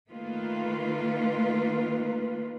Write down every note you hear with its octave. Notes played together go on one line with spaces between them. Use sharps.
D#3 A3 A#3 F4 B4